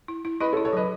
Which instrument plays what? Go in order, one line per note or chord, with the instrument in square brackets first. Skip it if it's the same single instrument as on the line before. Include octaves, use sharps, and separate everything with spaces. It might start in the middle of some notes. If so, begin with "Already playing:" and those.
[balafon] E4
E4
[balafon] E4 [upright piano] B4 D#5
[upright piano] A4 C#5
[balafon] E4
[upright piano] A4 C#5
[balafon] F#3 [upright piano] B4 D#5